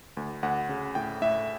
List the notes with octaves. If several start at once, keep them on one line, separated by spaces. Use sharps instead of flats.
D2
D2 F#5
C#3
A2 G5
A2 E5